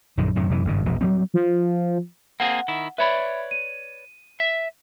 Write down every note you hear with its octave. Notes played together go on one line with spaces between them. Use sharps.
A#1 F#2 D3 D#3
F#2 A2 C3 D#3
F#2 C3 E3
G#1 G2 C#3
E1 A#1 B2
F#3 G3 C4
F3
A#3 C4 G#4 F#5
D#3 E4
B4 C#5 D5 E5 B5
D#7
E5